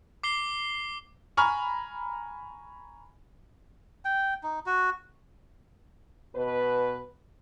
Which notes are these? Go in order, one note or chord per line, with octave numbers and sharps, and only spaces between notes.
D6 C7 G7
G#5 A#5 B5 C#6 F6
G5
D#4
F#4
B2 B4